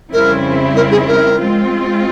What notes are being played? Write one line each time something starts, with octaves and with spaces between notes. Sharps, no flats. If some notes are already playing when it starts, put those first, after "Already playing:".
F2 C#3 G3 C4 E4 A#4
A#4
G#4
A#4
G#3 C4 F4